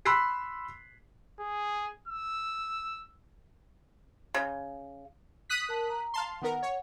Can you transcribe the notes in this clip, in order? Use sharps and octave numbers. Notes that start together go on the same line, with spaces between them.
B5 C6 E6 F#6 B6 C7
G#4
E6
C#3
D#6 F#6 B6
A#4 A5
A#5
F5 A5 C6
D#3 B3 A#4 F#5
C#5